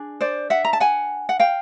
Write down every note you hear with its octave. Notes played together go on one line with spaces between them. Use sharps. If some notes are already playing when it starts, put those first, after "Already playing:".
Already playing: D4 G#4
C5 D5
E5 F#5
A#5
A5
F#5 G#5
F#5
F5 G5